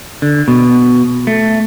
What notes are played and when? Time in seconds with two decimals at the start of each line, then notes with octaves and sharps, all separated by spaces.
0.22 D3
0.48 B2
1.27 A3